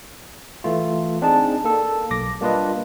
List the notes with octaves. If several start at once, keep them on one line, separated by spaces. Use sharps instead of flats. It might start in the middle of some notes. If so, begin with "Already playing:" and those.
E3 A3 F4
C4 D4 D#4 G#4 A5
A#3 A4
B1 D6 A#6
G3 A#3 D4 F4 B4 D#5